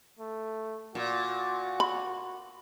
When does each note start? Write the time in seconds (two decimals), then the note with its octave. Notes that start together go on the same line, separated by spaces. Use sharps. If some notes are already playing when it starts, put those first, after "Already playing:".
0.19 A3
0.95 A#2 F#4
1.80 B5